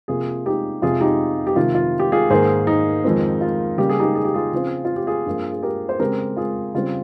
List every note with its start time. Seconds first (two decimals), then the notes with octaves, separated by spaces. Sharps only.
0.08 C3 F3 A#3 F4 G#4
0.46 D#4 G4
0.82 F2 C3 F3 F4 G#4
1.01 D#4 G4
1.47 G4
1.56 F2 C3 D#3 F4
1.75 F4
1.99 G4
2.12 F4 G#4
2.30 G#2 D#3 A#3 G#4 C5
2.67 D#4
3.04 F2 D#3 G#3 C4
3.41 F4
3.78 C#3 G3 A#3 G4
3.89 G#4
3.99 D#4 G4
4.15 G#4
4.25 G4
4.34 F4 G#4
4.53 C#3 F3 C4
4.85 F4
4.96 G4
5.07 F4 G#4
5.26 G2 F3 A#3
5.53 G#4
5.63 G4 A#4
5.89 C5
6.00 C#3 G#3 C4 G4 A#4
6.37 F4 G#4
6.75 C#3 G3 C4 F4